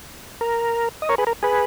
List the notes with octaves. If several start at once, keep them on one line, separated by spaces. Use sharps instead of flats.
A#4
D#5
A#4 C#5
G#4 B4
A#4
G#4 B4